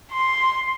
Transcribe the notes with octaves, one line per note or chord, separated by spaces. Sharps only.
C6